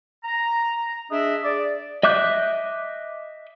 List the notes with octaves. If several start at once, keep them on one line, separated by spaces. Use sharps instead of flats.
A#5
D4 G#4 D#5 E5
G#4 D5
D#5 E5 D6 F#6 G6